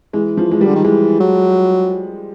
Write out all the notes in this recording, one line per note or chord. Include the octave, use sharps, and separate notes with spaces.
E3 G#3
F3
G#3
G3
D3
D#3
E3 G#3
F#3